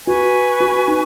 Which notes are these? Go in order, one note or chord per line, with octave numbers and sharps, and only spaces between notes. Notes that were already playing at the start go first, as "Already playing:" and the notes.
F#4 B4 G#5 C#6
F#4
D#4